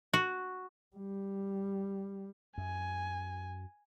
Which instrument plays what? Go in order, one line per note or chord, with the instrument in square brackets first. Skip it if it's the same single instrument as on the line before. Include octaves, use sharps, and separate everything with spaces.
[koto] F#4
[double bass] G3
[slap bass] F#2 [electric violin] G#5